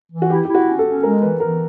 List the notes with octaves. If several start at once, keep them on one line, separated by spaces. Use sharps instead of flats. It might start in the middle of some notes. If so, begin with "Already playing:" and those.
E3
F#4
E4 G4
E4 G4
F#4
C#4
A4
C#4
G#3 A#4
E3 B4
E3 A#4